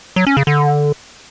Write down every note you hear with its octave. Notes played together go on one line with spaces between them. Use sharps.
F#3
C#4
C#3
D3